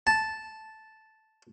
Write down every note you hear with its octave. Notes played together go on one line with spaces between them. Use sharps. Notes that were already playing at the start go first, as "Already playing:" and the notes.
A5